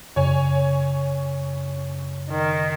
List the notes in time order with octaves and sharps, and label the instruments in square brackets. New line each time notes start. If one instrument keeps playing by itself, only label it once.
[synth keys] F#2 C#3 [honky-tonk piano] C#5 G#5
[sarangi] D#3